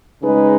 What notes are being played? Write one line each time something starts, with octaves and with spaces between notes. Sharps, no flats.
C#3 G#3 D#4 G#4 B4